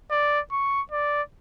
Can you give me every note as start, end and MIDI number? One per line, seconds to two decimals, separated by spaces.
0.11 0.40 74
0.52 0.82 85
0.91 1.22 74